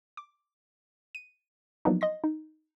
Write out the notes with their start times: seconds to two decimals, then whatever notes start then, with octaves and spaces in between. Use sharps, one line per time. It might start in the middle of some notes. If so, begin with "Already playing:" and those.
0.17 D6
1.15 D#7
1.85 F3 F#3 A#3 B3 D4 D#4
2.01 D#5 C6 A#6
2.24 D#4